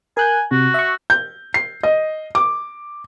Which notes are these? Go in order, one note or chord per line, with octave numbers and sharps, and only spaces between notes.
A#4 G#5 F#6 G6
C3 F#4
E5 C#6
G6
C7
D#5
D6